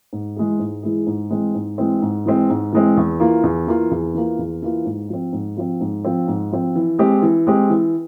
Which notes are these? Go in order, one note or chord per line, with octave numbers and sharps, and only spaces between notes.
G#2
E3 G#3 E4 G#4
G#2
E3 G#3 E4 G#4
G#2
E3 G#3 C4
G#2
E3 G#3 C4
G#2
E3 G#3 C4
G#2
E3 G#3 C4
E2
E3 A#3 F4
E2
E3 A#3 F4
E2
E3 A#3 F4
E2
E3 A#3 F4
G#2
F3 C4
G#2
F3 C4
G#2
F3 C4
G#2
F3 C4
E3
G#3 C4 G4
E3
G#3 C4 G4
E3